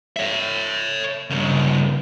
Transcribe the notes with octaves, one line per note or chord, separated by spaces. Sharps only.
C#5 E5
G2 C#3